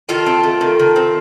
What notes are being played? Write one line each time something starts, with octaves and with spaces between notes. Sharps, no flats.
D#3 F4 A4
C4
A3
D#3
D#3
C4